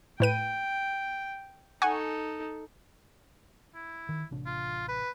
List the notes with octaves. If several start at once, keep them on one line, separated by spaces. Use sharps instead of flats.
A2 B4 G5 D#7
D#4 A4 F#5 G#5 C#6
E4
D#3
A1 C3 D4
F4
B4